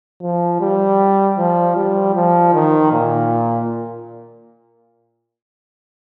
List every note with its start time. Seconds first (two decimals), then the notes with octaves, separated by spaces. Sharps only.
0.22 F3
0.60 G3
1.38 F3
1.76 G3
2.15 F3
2.54 D#3
2.92 A#2